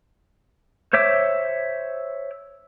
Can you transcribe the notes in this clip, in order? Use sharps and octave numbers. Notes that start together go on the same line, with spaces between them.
C5 C#5 E5 D6